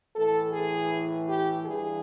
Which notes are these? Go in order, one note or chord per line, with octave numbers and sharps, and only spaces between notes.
A2 E3 A4
G#4
G4
G2 E3 G#4